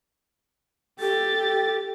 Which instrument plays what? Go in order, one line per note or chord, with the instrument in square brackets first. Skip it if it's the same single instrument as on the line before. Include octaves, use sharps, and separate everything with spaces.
[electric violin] G4 A6 [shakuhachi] A4